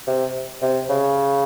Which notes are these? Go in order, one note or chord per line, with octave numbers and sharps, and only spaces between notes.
C3
C3
C#3